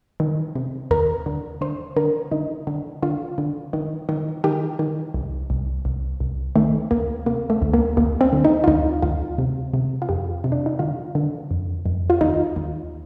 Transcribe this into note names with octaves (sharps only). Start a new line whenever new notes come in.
D#3
C3
D#2 A#4
D3
D3 C5
D3 A#4
D3 D#4
D3
D3 F4
D3
D#3
D#3
D#3 G4
D#3
C2
C2
C2
C2
D#3 A3
D2 A#3
C3 A#3
A3
D2
A#3
D2 A#3
C4
D3
D#4
F4
D2 D#4
D2 F4
C3
C3
F4
F2 G4
C3
D4
D#4
D3 F4
D3
F2
F2
F4
D#2 D#4
D#2